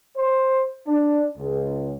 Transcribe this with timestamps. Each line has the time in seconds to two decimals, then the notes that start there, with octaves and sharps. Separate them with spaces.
0.15 C5
0.85 D4
1.36 C#2